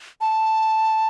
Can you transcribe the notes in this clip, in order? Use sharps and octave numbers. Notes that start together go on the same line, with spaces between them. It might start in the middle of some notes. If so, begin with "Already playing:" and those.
A5